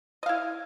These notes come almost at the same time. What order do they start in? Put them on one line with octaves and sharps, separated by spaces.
D#5 F5 E4